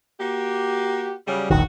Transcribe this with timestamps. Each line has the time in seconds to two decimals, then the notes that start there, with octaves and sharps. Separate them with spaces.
0.19 A#3 F#4 G4
1.27 C#3 F#3 G3
1.50 E1 A#1 D#3 F#4